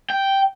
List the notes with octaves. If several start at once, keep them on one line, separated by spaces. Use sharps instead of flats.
G5